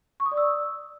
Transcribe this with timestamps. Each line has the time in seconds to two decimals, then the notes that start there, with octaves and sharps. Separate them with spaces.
0.20 C#6
0.26 D#6
0.32 D5
0.37 E6